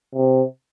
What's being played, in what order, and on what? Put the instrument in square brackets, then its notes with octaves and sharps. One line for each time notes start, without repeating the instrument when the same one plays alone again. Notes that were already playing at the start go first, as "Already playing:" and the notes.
[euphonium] C3